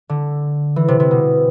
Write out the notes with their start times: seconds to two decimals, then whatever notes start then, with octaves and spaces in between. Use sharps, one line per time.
0.09 D3
0.76 E3
0.88 C3
1.00 C3
1.11 B2